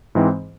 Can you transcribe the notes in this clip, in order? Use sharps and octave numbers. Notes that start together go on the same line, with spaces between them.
G#2 E3 G#3 C4